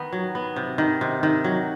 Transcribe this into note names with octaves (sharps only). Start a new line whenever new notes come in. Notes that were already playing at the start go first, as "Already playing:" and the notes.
Already playing: D#3 B3
F#3
B3
C3
D#3
C3
D#3
F#3